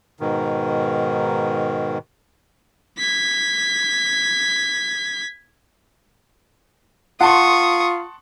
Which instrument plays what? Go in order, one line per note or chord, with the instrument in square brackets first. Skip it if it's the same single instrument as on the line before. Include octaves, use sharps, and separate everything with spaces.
[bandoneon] G#2 B2 D#3
[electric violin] G#6 B6
[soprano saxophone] F4 [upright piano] F#5 A5 C6 [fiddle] C#6 D#6